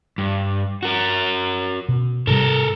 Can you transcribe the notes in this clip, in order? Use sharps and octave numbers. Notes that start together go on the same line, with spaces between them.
G2
F#4 A#4
B2
G#2 C3 G3 A4 A#4